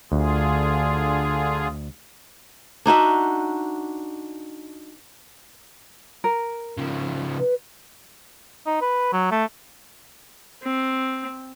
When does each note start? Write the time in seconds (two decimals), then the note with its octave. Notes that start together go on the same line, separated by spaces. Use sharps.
0.12 D2 D3 F4 G#4
2.86 D4 D#4 F#4 E5
6.24 A#4
6.78 C#3 F3
7.39 B4
8.66 D#4
8.82 B4
9.13 F#3
9.31 A3
10.62 C4